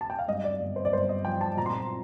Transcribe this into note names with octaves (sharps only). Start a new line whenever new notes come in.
A5
G5
F5
G2 D#5
D5
G1
C5
D5
G1 C5
D#5
F3 G5
A5
A#2 A#5
C6
A#5